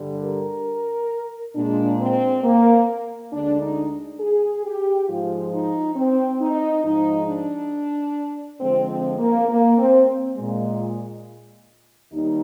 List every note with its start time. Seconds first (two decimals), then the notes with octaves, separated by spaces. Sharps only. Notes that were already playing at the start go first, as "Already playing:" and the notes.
Already playing: G2 D3 G3
0.23 A#4
1.55 A#2 G#3 D4
2.01 C4
2.43 A#3
3.33 D2 D3 G#3 D4
3.61 D#4
4.20 G#4
4.65 G4
5.08 G#2 F3 G#3 F4
5.52 D#4
5.96 C4
6.41 D#4
6.84 G#2 F3 G#3 D#4
7.28 D4
8.60 F2 D3 F3 G#3 C4
8.90 C4
9.19 A#3
9.49 A#3
9.78 C4
10.36 A#2 G#3
12.12 D#2 D#3 G3 D#4